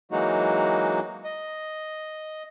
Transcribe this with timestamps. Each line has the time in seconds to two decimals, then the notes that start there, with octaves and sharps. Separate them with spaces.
0.12 E3 F#3 G#3 A#3 D#4 F#4
1.24 D#5